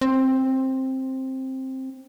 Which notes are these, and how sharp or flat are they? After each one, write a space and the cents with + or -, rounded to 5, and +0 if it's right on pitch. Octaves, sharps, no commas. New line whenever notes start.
C4 +10